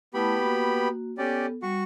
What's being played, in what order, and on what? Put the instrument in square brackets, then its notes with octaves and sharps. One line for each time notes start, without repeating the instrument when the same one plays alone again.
[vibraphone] A3 E4 A5 [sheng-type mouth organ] B3 G4 B5
[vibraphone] A#3 F#4
[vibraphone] B3 A4 [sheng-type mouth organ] C#4 G4 D5
[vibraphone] G3 [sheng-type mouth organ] F#4 C#6